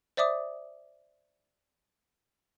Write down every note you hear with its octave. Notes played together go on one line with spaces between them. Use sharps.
C5 D5 E5 D6 D#6